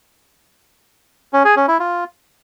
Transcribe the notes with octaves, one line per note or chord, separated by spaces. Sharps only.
C#4
G#4
C#4
E4
F4